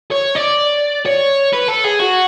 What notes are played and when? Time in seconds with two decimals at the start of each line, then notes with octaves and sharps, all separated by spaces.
0.12 C#5
0.36 D5
1.06 C#5
1.53 B4
1.68 A4
1.84 G#4
1.99 F#4